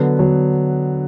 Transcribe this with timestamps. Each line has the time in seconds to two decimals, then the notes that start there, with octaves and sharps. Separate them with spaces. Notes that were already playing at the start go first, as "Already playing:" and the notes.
Already playing: D3 F#3 B3
0.19 D3 F#3 B3